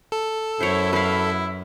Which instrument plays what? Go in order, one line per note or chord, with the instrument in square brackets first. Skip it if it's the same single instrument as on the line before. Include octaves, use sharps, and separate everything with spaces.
[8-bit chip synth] A4
[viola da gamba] F#2 [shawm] E4 [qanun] C5 C#5
[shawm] E4 [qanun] B4 F5